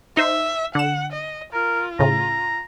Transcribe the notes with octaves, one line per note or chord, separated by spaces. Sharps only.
D#4 C5 E5
D3 F#5 E7
D#5
F4 A#4
A2 C#3 A#5